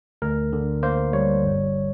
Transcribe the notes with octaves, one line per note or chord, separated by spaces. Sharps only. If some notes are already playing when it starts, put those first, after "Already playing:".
D2 A#4
D3
A#3 C5
G3 C#5
G1